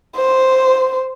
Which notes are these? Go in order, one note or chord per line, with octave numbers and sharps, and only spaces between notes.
C5